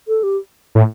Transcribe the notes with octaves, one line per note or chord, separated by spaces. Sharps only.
A4
G4
A2